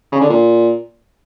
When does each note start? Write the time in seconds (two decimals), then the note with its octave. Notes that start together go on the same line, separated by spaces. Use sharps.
0.12 C#3
0.21 D3
0.29 A#2